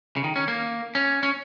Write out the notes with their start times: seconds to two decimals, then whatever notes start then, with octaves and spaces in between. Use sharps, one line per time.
0.16 C#3
0.24 D#3
0.36 C#4
0.48 A#3
0.95 C#4
1.23 C#4